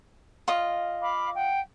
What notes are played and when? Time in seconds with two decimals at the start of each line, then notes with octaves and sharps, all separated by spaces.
0.48 F4 D#5
1.02 F5 B5 D6
1.35 F#5 G5